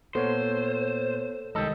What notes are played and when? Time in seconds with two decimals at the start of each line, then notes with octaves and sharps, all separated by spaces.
0.15 A#2 B3 A4 C5 C#5
1.55 C2 D#3 G#3 G4 A4 D#5